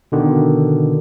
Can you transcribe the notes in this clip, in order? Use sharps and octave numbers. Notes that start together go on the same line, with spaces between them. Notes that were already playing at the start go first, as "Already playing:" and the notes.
B2 D3 D#3